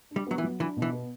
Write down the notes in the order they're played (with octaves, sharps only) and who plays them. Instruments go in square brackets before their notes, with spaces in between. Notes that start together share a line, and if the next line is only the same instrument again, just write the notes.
[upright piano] D4
[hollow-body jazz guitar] G3
[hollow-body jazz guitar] F#3 [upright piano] B3
[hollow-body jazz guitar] E3
[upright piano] F#3
[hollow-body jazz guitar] E3 [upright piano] D4
[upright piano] B2
[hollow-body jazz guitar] E3
[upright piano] B3